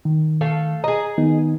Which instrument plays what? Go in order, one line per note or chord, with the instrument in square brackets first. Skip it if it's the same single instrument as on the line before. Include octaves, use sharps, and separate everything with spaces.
[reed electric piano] D#3
[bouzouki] A3 A4 F5
[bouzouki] G#4 D#5 [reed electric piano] A#5
[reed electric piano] D#3 B3 D#4